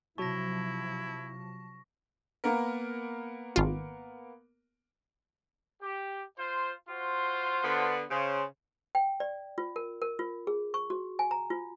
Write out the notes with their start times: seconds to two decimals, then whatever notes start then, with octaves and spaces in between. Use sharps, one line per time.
0.18 C3 F3 F#3 E4 A5 C#6 A#6
2.44 A#3 B3 A#4
3.56 G#1 F4
5.81 G4
6.37 F4 C5
6.89 F4 F#4 C5
7.64 D3 B3
8.10 C#3 C5
8.95 G5
9.20 D5
9.58 F4
9.76 A#4
10.02 A#4
10.19 F4
10.47 G#4
10.74 C#6
10.90 F#4
11.19 G#5
11.31 A#5
11.50 F4